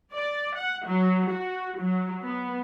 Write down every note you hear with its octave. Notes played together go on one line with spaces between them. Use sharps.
D5
F#5
F#3
F#4
F#3
B3